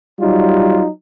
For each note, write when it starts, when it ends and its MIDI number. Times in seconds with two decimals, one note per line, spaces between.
0.20 0.87 54
0.20 0.82 55
0.20 0.87 63
0.20 0.87 65